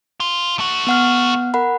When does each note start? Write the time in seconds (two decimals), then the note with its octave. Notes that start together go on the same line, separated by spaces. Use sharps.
0.20 F4
0.59 A3 F#4
0.87 B3 F#5 F6
1.54 A#4 F#5 B5